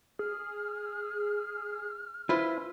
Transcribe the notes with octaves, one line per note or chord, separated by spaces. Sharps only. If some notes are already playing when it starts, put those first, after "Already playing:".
G#4 F6
E4 F4 B4 C5